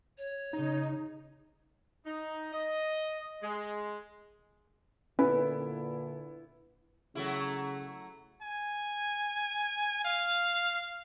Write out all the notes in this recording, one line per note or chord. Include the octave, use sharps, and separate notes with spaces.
C#5
C#3 D#4
D#4
D#5
G#3
A#2 D3 B3 C#4 E4 B4
C#3 F#3 A3 E4
G#5
F5